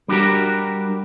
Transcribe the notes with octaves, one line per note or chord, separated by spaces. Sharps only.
G3 D4 F#4 G4 A#4